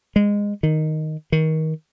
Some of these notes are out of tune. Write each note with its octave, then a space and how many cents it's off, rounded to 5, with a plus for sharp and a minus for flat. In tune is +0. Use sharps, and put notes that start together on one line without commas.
G#3 -20
D#3 +0
D#3 +25